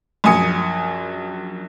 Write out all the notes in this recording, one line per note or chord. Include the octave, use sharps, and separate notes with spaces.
A#1 F#2 G#5 D#6 C#7